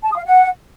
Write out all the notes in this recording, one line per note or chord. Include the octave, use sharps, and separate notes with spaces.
A5
D#6
F5
F#5